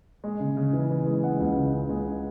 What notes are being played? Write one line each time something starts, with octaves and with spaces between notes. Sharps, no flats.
G#3
C#3
C#3
E3
E3
G#3
G#3 F#5
C#2
C#3
C#3
G#3